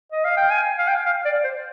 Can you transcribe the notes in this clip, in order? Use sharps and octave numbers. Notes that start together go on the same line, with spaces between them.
D#5
F5
G5
G#5
F5
G5
F5
D5
C5